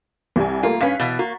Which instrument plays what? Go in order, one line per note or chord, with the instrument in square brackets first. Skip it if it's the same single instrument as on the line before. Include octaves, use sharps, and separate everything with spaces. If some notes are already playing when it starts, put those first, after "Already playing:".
[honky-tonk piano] C2 G3 G#5
[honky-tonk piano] A3 A#3 [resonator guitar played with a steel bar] F4
[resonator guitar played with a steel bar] G2 C#4 [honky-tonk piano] B4 F5 B6
[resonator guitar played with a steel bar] B2 E3 [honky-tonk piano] A6
[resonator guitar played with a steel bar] A#3 [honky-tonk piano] F#4